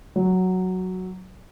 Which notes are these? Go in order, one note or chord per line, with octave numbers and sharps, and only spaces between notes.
F#3